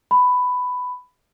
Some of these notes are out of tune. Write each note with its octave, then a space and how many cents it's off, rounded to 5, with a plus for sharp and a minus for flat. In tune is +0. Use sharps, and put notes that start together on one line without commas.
B5 +10